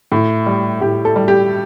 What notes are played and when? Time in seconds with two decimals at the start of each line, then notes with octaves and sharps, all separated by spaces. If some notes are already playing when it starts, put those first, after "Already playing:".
0.12 A2
0.46 G3
0.81 A2 G4
1.05 A4
1.16 G3
1.28 G4